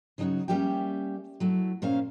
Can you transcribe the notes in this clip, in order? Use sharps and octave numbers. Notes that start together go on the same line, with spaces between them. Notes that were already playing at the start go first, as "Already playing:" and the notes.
C#3 F#3 D#4 F4 F#4
G3 A#3 C#4 G4 E5 G5
F#3 A3 E4
A#2 A#3 C#4 C5 F5